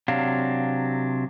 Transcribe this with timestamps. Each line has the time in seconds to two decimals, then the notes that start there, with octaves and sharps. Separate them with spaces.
0.08 C3 F#3 D4 F5